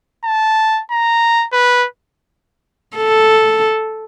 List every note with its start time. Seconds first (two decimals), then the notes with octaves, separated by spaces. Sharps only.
0.25 A5
0.91 A#5
1.53 B4
2.97 A4